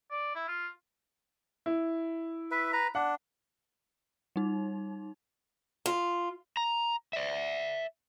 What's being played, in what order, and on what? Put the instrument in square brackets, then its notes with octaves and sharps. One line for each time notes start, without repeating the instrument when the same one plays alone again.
[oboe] D5
E4
F4
[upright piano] E4
[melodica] B4 E5
B4 A#5
[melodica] D4 [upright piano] F#5
[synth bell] G3 D#4
[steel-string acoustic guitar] F4
[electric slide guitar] A#5
D5 E5